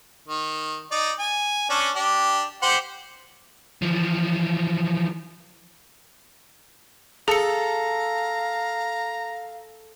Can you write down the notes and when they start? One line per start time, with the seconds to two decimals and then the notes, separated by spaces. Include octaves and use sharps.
0.28 D#3
0.92 D#4 D5
1.19 G#5
1.70 C#4 D4
1.95 D4 G4
2.62 G4 C5 F#5
3.82 E3 F3
7.28 G#4 A4 F5 A#5 C#7